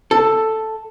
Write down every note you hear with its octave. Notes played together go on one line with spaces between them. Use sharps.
A4